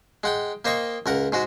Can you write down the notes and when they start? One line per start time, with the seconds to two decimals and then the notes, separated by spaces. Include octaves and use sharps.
0.24 G#3 F#5 G5
0.65 A#3 C5 D#5 G5 C#6
1.06 C#2 A#4 F#5
1.32 G#2 G#3 F#4